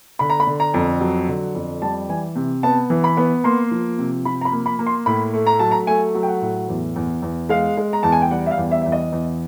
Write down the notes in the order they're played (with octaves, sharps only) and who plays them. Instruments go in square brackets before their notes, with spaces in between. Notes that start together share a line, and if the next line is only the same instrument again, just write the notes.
[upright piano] D3 B5
A#5
B5
D3
A#5
F2
F#3
D3
F2
G3 A5
E3 G#5
C3
B3 A5
E3
B5
B3
A#3 C6
F3
C3
F3 B5
A#5
B5
A#3
B5
A#3
C6
A2 B5
A3
A#5
F#3 A5
A#5
A3 G#5
F#3
G5
F#5
A2
E2
E2
E2
G#3 F5
G#3
A#5
E2 A5
G#5
G5
G3 F#5
E5
F5
E2
E5
E2 E5
D#5
E2